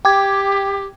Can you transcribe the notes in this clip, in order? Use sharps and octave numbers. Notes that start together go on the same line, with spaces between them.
G4 G5 D6 G#6